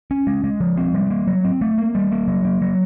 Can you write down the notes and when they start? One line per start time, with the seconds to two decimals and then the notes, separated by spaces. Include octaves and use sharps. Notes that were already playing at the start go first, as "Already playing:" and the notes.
0.11 C#4
0.27 G#3
0.44 G#3
0.60 F3
0.77 C4
0.94 G3
1.10 A#3
1.28 F#3
1.44 C4
1.61 A3
1.78 A#3
1.95 G3
2.12 A#3
2.28 F#3
2.45 A#3
2.62 F#3